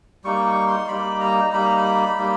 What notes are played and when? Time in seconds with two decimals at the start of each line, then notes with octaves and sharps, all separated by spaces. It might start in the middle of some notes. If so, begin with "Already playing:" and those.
0.24 G3 A#3 D#4 C#6
0.46 C#6
0.67 C6
0.88 G3 A#3 D#4 B5
1.20 A#5
1.53 G3 A#3 D#4 B5
1.65 A#5
1.77 B5
2.18 G3 A#3 D#4